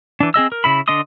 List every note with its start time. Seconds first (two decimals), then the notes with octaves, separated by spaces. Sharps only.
0.20 E3 D4
0.34 C4 G#4 D#5 E6
0.52 A#4
0.64 C#3 E4 B5
0.88 D3 D4 D#5 C6 D#6